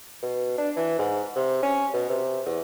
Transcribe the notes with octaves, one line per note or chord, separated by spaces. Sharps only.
B2
D4
E3
G#2
C3
C#4
B2
C3
E2